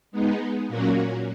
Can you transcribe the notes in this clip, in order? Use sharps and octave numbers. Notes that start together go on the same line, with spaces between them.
G#3 B3 D#4
A#2 F#3 A#3 C#4 F#4